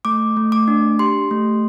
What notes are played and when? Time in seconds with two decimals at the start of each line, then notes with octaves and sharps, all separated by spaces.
0.05 A3 D6
0.37 A3
0.52 D6
0.68 D4
0.99 G4 C6
1.31 A3